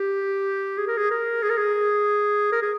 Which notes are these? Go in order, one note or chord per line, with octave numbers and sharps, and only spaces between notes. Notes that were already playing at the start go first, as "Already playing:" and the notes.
Already playing: G4
G#4
A#4
G#4
A#4
G#4
A#4
G#4
A#4
G#4